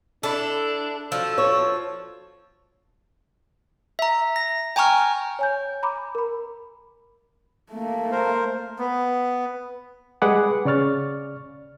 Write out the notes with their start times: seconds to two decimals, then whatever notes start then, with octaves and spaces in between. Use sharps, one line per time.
0.23 D4 E4 A4
1.12 F3 D4 F#4 A4
1.38 C#5
3.99 E5 A#5
4.36 A#6
4.76 G5 G#5 A#5 C#6 F6
5.39 C#5 G#5 G6
5.83 A#5 B5 D6
6.15 A#4 B5
7.72 A3 A#3
8.12 A#4 C5
8.79 B3
10.22 G3 G#3 G#4 B4 F#5 D6
10.65 C#3 D5 C#6 F6 A6